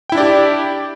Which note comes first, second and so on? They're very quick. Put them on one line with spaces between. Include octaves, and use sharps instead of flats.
G5 E4 D4 D5 G4